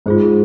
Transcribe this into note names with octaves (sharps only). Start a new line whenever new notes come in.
G#2 F4 G#4 C5